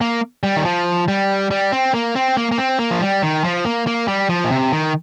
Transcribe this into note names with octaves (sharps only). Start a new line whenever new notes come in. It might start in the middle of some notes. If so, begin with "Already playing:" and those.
A#3
G3
D#3
F3
G3
G3
C4
A#3
C4
A#3
A#3
C4
A#3
F3
G3
D#3
F3
A#3
A#3
G3
F3
A#2
C3
D#3